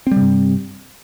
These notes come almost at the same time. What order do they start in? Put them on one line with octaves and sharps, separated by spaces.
C4 G3 C3 G2